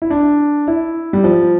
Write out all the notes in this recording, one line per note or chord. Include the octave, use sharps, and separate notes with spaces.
E4
D4
E4
G3
F3